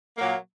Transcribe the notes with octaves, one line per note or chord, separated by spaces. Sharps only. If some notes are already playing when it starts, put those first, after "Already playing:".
A#2 F#3 A#3